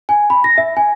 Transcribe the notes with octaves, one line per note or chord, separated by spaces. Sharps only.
G#5
B5
A#6
E5
G#5